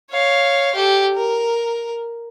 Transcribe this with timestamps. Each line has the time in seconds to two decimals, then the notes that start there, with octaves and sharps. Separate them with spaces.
0.10 C#5 F5
0.75 G4 A4
1.14 A#4